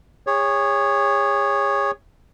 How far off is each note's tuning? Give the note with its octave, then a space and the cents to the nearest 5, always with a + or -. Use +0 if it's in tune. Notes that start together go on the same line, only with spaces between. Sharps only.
G#4 -35 C#5 +0